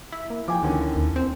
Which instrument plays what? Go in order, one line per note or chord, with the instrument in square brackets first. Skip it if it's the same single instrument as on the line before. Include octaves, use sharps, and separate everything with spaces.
[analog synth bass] E4
[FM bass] A#3
[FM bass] F3 [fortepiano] G5 G#5 D6
[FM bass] D2 [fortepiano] D3 D#3 C#4
[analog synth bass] D#2
C4